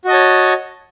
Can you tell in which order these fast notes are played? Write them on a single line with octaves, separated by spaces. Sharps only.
F#4 D#5 A5 C#5